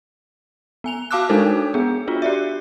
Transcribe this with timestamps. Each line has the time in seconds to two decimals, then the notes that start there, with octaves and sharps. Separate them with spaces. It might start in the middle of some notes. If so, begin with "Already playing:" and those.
0.84 B3 G#5 F7
1.11 F#4 F5 A5 D6 E6 F#6
1.29 G#3 D4 D#4 A4 A#4 C5
1.74 B3 G#4
2.07 D4 F4 F#4
2.22 G4 D5 E5